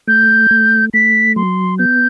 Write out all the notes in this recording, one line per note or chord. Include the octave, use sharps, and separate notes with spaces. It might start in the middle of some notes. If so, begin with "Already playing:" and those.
A3 G6
A3
A3 B6
F#3 C6
B3 G6